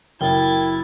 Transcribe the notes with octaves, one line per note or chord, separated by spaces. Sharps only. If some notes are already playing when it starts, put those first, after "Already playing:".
F#1 E4 A#4 G5 G#6 A6 G7